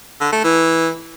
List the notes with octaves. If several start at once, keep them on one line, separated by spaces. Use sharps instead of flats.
D3
A3
E3